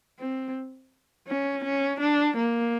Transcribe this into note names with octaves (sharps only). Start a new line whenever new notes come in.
C4
C#4
C#4
D4
A#3